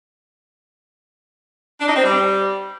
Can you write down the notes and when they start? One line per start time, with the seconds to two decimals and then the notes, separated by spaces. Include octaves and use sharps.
1.80 D4
1.88 D#4
1.96 C4
2.04 G3